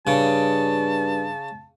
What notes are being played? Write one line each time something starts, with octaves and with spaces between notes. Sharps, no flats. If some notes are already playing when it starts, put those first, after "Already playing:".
G2 C#3 A5